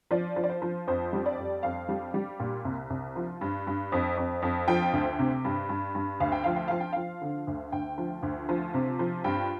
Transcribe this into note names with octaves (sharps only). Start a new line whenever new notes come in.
F3 D5
F3
D5
C5
F3
F2 C5
G3
D5
F2
F2 F5
G3
G3
A#2
C2
C2
F3
G2
G2
F2
F2
F2
F3 G5
D2
C3
G2
G2
G2
D2 F5
G5
F3 F5
G5
F3 F5
G5
F3 F5
D3
D2
D2 G5
F3
D2
F3
C3
F3
G2 G5